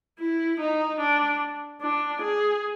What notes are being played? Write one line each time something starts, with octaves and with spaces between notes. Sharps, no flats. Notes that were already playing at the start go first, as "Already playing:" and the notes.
E4
D#4
D4
D4
G#4